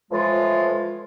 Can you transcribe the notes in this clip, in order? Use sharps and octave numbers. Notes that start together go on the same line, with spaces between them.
A2 E3 F3 G#3 F4